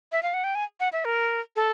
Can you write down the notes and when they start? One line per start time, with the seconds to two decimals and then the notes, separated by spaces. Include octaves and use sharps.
0.12 E5
0.23 F5
0.34 F#5
0.44 G5
0.55 G#5
0.80 F#5
0.93 E5
1.05 A#4
1.56 A4